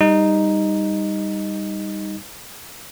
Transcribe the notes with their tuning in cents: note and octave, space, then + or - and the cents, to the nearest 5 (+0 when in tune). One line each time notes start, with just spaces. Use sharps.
G3 +20 D#4 +0